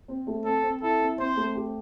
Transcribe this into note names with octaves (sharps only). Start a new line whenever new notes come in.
C4
A3
C4 A4
C4
E4 A4
C4
C4 C5
A3
G4